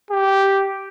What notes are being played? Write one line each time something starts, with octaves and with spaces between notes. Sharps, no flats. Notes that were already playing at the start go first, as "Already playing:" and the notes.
G4